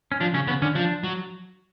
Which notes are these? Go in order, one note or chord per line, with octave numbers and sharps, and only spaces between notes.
C#4
F3 D4
C#3 C#4
C#3 B3
D3 C#4
F3 D4
F#3